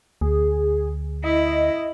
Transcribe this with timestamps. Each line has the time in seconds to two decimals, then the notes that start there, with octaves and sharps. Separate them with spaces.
0.21 D2 G#4
1.24 E4 D#5